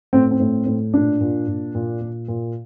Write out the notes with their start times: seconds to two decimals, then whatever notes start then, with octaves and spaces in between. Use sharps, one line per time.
0.13 A2 C4
0.31 C4
0.40 A2
0.66 A2
0.94 A#2 D4
1.21 A#2
1.48 A#2
1.75 A#2
2.01 A#2
2.28 A#2